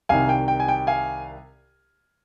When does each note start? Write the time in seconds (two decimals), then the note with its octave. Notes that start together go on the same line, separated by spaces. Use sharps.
0.09 C2 C3 D#3 F5 G#5
0.29 G5
0.48 G5
0.60 G#5
0.68 G5
0.87 F5 G#5